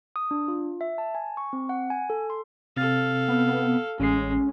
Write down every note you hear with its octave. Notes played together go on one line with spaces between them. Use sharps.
D#6
D4
F4
E5
A5
G#5
C#6
C4
F#5
G#5
A4
C6
C3 C4 A4 F5 A6
B3
A1 G#3 C#4 C7